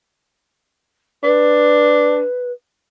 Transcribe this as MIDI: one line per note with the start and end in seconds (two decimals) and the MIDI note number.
1.23 2.23 62
1.23 2.51 71